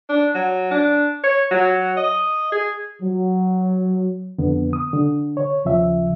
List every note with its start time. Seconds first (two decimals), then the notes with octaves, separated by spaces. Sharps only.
0.10 D4
0.35 F#3
0.71 D4
1.24 C#5
1.51 F#3
1.97 D#5
2.52 G#4
3.01 F#3
4.39 F2 D3 B3
4.73 D#6
4.93 D3
5.37 C#5
5.65 D#2 C#3 F3 E5